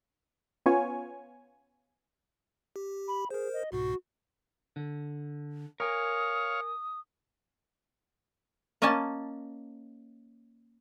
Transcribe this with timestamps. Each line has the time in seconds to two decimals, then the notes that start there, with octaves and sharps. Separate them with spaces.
0.66 B3 C#4 F4 C#5 G#5
2.76 G4
3.08 B5
3.30 G#4 A#4 C5
3.53 D#5
3.72 C2 G#2 B2 F#4
4.76 D3
5.80 A#4 C#5 F5 G#5 D#6
8.82 A#3 C#4 D#5 G#5 A5